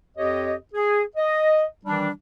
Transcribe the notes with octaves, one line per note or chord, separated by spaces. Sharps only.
F2 G4 C#5 D#5
G#4
D#5
D#3 E3 G3 D4